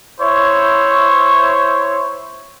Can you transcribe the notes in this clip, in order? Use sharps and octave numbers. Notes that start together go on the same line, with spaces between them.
E4 C5 C#5